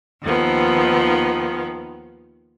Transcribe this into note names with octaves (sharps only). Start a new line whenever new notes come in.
D#2 D#3 F3 B3